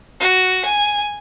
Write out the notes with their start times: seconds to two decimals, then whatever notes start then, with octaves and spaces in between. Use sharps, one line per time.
0.20 F#4
0.65 G#5